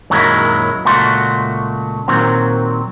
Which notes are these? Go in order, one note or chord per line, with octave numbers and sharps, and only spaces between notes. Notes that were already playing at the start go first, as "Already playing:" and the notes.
F#2 A#2 D#3 F#3 G#3 E4
C#2 A#2 A3 F#4 C6
A#2 D#3 F#3 C4